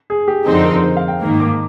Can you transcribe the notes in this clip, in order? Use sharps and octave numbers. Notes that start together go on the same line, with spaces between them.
G#4
G4
F2 D3 F3 C4 D#4 G#4
A#4
C5
F5
G5
G#2 D#3 A#3
D6